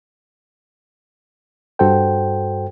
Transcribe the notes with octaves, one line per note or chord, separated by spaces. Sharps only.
G2 F#4 A4 C5 G5